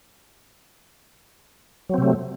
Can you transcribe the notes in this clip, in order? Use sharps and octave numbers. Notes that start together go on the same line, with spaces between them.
C3 F#3 A3 C4